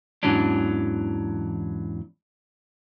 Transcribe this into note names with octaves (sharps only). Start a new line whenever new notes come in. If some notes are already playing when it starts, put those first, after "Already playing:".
E2 G#2 E3 F#3 C#4 D4